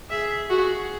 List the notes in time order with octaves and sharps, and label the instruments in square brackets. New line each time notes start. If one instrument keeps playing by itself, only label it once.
[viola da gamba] G#4 [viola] E5
[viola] F#4 [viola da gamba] G#4